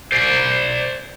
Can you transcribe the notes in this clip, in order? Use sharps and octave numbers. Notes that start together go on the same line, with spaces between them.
C5 D5